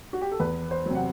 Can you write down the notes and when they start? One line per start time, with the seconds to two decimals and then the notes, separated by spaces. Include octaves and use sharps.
0.13 F#4
0.21 G4
0.31 A4
0.40 E2 B4
0.71 C5
0.86 C3 F#3
0.95 F#5